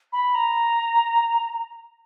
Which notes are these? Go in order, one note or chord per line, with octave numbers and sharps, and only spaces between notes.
B5
A#5